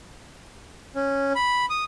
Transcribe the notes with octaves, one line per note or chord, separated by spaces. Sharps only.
C#4
B5
D#6